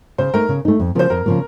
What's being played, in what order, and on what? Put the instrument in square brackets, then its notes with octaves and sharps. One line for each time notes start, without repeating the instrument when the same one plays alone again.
[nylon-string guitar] C#3 [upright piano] C5
[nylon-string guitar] A3 D#4 [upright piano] A#4
[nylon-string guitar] C#3
A3 D#4
F2
[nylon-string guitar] C#3 F3 A#3 [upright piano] C5
[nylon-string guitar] F2 [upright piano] A#4
[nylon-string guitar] C#3 F3 A#3